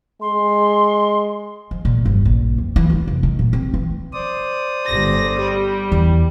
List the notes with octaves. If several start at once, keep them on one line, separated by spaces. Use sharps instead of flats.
G#3 C6
F3
A#2
G1
A#1
F2
E3
F4
F1
D#3
A#2
C4
E3
C5 D5 D#6
G1 A#6
G3
E2